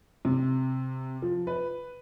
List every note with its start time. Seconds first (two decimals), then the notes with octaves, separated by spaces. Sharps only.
0.25 C3
1.22 F3
1.47 B4